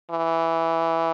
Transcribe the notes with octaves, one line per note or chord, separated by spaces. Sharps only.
E3